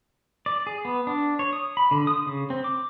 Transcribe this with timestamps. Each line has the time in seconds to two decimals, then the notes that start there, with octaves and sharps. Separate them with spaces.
0.46 D5
0.67 G#4
0.85 B3
1.07 D4
1.39 C#5
1.53 D#6
1.77 B5
1.91 D3
2.07 D#6
2.26 C#3
2.50 C4
2.64 D6